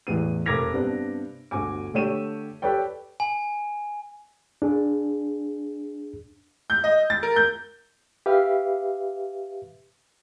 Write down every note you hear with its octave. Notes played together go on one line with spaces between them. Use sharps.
A1 E2 B3 D#7
F1 A#4 D6 G#6 A#6 F7
G2 C3 B3 D4
G1 D2 F#4 G#5 D6
D3 A3 G4 C#5 D#7 E7
G4 A4 B4 C#5 D5 G5
G#5
D4 G#4
G6
D#5
A6
A#4
G6
G4 B4 E5 F5